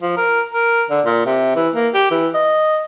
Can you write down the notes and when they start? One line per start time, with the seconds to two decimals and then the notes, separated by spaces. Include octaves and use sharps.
0.01 F3
0.17 A#4
0.54 A#4
0.90 D3
1.06 A#2
1.26 C3
1.56 E3
1.75 A#3
1.94 G4
2.11 E3
2.34 D#5